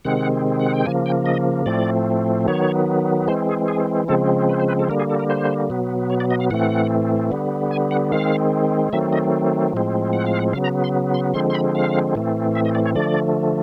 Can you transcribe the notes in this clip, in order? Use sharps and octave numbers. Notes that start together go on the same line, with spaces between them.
C3 D#3 G#3 C4 F#5
F#5
G5
C#3 F3 A#3 G#5
G5
D#5
A2 F3 A3 C4 D5
D#3 F#3 B3 C#5
E3 G#3 C4 C5
G#4
G#4
C#3 F3 G#3 C4 A4
B4
C5
B4
A4
D3 G3 A#3 A#4
G#4
A4
A#4
C5
B2 F#3 B3
C#5
D5
D#5
F5
A2 E3 A3 C4 F#5
D3 G3 B3
G#5
F#5
D#3 G#3 C4 F5
D#3 F#3 A3 C4 E5
D#5
A2 F3 G#3 C4
F#5
F5
F#5
C#3 F#3 B3 F5
A#5
C6
C6
D3 F3 G#3 C4 C6
C6
B5
F5
A2 E3 A3 C4
E5
D#5
D5
C#5
D3 F3 A3 D5